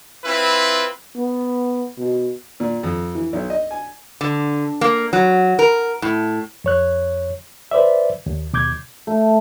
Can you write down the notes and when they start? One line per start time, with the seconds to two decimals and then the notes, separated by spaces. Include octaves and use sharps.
0.25 C4 E4 F4 B4
1.15 B3
1.98 B2
2.60 A#2
2.83 F2
3.15 E3
3.33 B1
3.50 D#5
3.71 G#5
4.21 D3
4.81 A#3
5.13 F#3
5.59 A#4
6.02 A2
6.64 F2 C#5 F#6
7.71 B4 C5 D5 E5
8.26 D#2
8.53 D#2 B2 D6 G6 G#6
9.07 A3